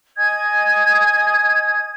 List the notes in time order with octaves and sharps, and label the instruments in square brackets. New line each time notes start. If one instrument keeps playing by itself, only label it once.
[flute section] D#5 G#5 D#6 G#6